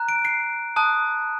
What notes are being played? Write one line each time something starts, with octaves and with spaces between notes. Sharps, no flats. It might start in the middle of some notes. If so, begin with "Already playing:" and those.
Already playing: A#5 F#6
D7
C7
A5 D#6 F#6